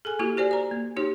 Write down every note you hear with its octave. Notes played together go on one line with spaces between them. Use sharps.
G#4 A4 G#5
A#3 E4 F#4 G4
G4 C5 D5 G#5
D5 A#5
A#3
D#4 F#4 G4 C#5